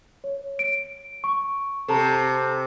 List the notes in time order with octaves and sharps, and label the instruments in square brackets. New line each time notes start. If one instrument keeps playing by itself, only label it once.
[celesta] C#5
D7
C#6
[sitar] C3 [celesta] A4 A5 A#5